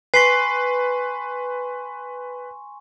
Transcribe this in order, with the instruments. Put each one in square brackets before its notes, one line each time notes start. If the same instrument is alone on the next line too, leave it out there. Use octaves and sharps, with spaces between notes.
[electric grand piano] B4 [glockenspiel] G#5 C6 C#6 [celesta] B6 C7